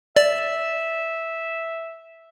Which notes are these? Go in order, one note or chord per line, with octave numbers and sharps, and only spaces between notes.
D5 E5